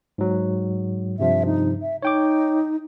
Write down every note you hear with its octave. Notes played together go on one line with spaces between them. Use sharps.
G#2 F#3
G2 C3 F3 E5
D#4
E5
D#4 C#5 G5 D6